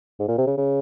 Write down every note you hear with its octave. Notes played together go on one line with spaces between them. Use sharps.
G#2
A#2
C3
C#3
C#3